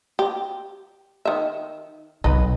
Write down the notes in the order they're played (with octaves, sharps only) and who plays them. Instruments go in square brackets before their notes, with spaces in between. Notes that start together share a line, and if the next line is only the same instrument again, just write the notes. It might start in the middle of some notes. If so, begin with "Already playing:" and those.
[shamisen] G4
D#3 E5
[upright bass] B1 [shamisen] D#4 B4